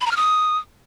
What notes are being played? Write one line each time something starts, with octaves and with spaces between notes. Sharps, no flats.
B5
A#5
F6
D#6